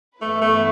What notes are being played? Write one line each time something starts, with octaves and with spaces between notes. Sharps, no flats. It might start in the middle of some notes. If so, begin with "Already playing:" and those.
G2 E3 A3 B3 E4 B4
A3